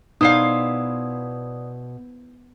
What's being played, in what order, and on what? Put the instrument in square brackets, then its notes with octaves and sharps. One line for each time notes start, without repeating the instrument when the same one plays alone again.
[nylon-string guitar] B2 [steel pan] D#4 [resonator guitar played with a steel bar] E4 C5 F5 [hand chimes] D5 D#6